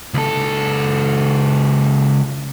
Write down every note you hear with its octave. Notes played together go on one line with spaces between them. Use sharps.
C#2 A4